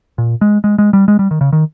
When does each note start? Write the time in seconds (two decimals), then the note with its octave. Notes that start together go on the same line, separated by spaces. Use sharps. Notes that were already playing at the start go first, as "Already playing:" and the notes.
0.18 A#2
0.41 G#3
0.64 G#3
0.78 G#3
0.93 G3
1.08 G#3
1.19 G3
1.31 D#3
1.41 C#3
1.53 D#3